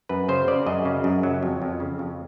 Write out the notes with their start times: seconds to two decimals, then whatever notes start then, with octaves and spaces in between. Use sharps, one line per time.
0.09 F#2 B4
0.29 C#3 C5
0.48 C#3 D5
0.66 F#2 D#5
0.85 C#3
1.04 F#2
1.23 F#3
1.43 F2
1.62 F2
1.80 C#3
1.99 F2